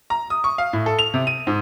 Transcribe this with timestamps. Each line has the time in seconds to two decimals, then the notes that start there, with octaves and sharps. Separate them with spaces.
0.10 A#5
0.30 D#6
0.44 C#6
0.58 F5
0.73 A2
0.86 A4
0.99 F7
1.14 C3
1.27 D#7
1.47 G#2